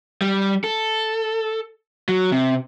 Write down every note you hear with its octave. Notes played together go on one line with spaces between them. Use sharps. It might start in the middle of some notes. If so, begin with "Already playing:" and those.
G3
A4
F#3
C3